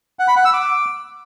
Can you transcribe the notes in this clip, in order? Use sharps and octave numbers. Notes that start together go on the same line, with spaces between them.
F#5
B5
F#5
E6
D6